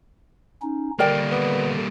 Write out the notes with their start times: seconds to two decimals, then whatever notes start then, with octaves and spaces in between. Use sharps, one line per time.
0.62 C#4 D#4
0.99 D3 G3 A#3 A#4 D5 G5
1.31 B3